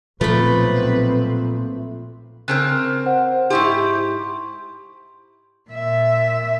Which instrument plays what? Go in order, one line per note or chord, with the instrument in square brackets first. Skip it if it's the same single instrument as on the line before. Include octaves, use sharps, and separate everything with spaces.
[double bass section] B1 C4 [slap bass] A#2 F3 [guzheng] A3 B5 [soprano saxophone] B4
[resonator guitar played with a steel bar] C#3 C4 A#4 [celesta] F#6
[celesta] C5 F#5
[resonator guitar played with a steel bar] G#2 E4 G4 [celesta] C6 C#6
[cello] A#2 E5